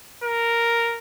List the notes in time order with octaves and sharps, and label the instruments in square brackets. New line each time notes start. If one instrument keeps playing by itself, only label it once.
[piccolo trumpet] A#4